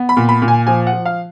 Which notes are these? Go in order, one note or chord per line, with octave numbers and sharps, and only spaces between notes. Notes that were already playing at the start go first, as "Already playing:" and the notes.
Already playing: B3
B5
A#2
B5
A#2
G#5
F3 G#5
F#5
F3
F5